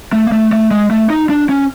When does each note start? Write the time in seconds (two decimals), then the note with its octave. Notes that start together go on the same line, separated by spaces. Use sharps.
0.13 A3
0.27 A#3
0.32 A3
0.53 A3
0.71 G#3
0.91 A3
1.10 D#4
1.30 D4
1.49 C#4